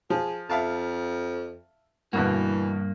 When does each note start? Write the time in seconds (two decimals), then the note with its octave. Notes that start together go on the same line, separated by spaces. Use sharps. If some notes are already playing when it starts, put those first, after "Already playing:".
0.10 F3 G#4
0.50 F2 E5 F5 A5
2.13 D2 G2 B2 E3 A#3 F#4